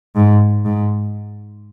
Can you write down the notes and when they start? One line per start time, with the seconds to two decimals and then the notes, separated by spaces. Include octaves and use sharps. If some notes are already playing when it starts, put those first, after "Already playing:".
0.16 G#2
0.65 G#2